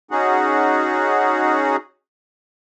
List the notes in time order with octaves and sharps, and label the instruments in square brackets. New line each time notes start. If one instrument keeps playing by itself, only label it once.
[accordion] C#4 D#4 F#4 G#4 F#5